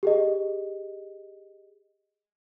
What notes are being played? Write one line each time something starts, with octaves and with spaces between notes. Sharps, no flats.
G4 G#4 D#5